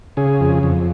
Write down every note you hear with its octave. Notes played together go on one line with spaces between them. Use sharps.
C#3 G#4
F2
F2